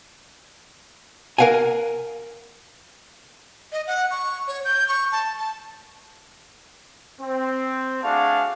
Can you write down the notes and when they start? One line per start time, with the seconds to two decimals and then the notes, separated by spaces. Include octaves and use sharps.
1.38 A#4 B4 F5 F#5 G#5
3.72 D#5
3.87 F#5
4.11 C#6
4.48 C#5
4.65 G6
4.88 C#6
5.12 A5
5.37 A5
7.21 C4
8.04 A3 D4 F#4 G#4 F5 A5